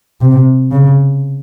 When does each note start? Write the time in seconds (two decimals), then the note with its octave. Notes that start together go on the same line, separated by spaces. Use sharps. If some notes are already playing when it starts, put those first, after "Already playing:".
0.21 C3
0.72 C#3